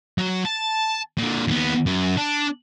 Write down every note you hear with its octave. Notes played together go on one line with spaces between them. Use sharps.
F#3
A5
A#2 D3
D#2 B3
F#2
D4